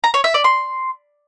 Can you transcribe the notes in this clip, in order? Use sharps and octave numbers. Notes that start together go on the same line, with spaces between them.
A#5
C#5
E5
D5
C6